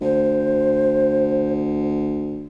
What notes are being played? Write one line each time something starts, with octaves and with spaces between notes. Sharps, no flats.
D2 C5